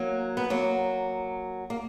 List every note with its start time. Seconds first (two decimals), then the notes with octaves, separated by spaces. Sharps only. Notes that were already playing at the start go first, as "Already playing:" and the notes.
Already playing: F#3 A#3
0.37 B3
0.50 F#3 A#3
1.70 A#3